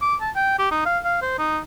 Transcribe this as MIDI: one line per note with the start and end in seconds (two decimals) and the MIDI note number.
0.01 0.15 86
0.21 0.30 81
0.36 0.55 79
0.59 0.67 67
0.71 0.84 63
0.86 0.98 77
1.05 1.18 77
1.22 1.35 72
1.39 1.59 63